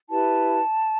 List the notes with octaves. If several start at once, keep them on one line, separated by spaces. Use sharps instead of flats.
E4 G4 B4 A5